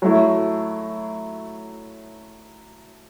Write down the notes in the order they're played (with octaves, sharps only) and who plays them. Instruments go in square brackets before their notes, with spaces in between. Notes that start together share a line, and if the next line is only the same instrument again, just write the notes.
[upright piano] F#3 A3 E4